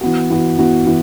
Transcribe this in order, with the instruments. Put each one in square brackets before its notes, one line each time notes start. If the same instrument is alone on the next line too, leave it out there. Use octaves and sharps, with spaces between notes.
[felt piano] E3 B3 F#4
E3 B3 F#4
E3 B3 F#4
E3